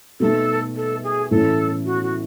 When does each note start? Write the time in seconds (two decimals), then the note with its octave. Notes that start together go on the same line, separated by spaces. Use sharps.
0.20 B2 A3 D#4 A4
0.76 A4
1.03 G#4
1.31 A2 E3 A3 C#4 A4
1.85 F#4
2.03 F#4